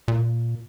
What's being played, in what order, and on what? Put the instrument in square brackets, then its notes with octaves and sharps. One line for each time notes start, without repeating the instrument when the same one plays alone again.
[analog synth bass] A#2